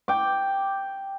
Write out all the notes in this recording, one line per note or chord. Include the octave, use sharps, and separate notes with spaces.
G5 D6